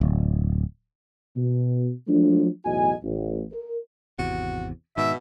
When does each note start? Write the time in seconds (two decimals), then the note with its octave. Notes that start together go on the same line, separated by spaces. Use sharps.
0.01 D1
1.36 B2
2.08 F3 F#3 G#3 A3 D4
2.65 B1 E2 A2 F#4 D#5 G#5
3.04 A1
3.52 A#4
4.19 G#1 E2 C3 F#4
4.97 G#2 B2 D#3 E5